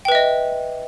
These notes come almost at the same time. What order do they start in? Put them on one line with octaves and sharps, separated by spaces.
G5 B4 E5 D#5